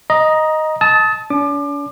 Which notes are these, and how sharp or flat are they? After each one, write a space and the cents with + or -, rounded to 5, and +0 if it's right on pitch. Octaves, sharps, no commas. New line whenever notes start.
D#5 +0 A#5 +20
A5 -10 D#6 +35
D4 -45 D6 +30